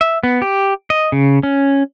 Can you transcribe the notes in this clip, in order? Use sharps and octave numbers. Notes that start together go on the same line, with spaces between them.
E5
B3
G4
D#5
C#3
C#4